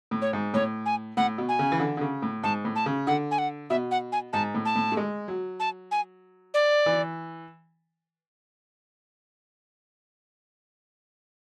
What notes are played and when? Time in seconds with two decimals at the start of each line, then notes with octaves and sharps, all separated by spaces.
0.11 A2
0.22 C#5
0.33 G#2
0.54 A2 C#5
0.86 G#5
1.17 A2 F#5
1.38 B2
1.49 G#5
1.59 C#3
1.72 E3
1.80 D3
1.97 D3
2.01 C#3
2.22 A2
2.43 G#2 A5
2.65 A2
2.76 A5
2.86 C#3
3.07 D3 F#5
3.31 G#5
3.38 F#5
3.70 B2 E5
3.91 F#5
4.12 G#5
4.33 G#2 A5
4.54 A2
4.65 A5
4.76 A2
4.92 A3
4.97 G#3
5.28 F#3
5.60 A5
5.91 G#5
6.54 D5
6.86 E3